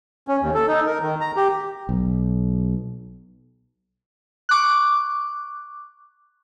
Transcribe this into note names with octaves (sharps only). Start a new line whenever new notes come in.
C#4
D#2
A4
D#4
A#4
D#3
A#5
G4
B1
C#6 D6 F#6